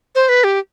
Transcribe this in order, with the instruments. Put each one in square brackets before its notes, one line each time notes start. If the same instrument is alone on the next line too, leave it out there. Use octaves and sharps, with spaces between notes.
[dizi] C5
B4
G4